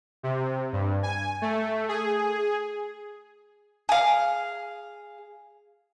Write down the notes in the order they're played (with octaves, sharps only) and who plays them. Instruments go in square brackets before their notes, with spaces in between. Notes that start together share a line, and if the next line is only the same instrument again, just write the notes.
[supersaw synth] C3
G2
G#5
A3
G#4
[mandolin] G#4 F5